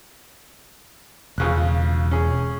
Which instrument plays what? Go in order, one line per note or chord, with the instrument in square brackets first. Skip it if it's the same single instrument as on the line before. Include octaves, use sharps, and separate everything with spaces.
[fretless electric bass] E1 [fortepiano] F2 C#3 F#6
[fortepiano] C#4 G#4